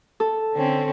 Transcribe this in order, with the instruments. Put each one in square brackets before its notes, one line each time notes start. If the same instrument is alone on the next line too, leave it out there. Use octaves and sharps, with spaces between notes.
[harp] A4
[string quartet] D3 C4 C#4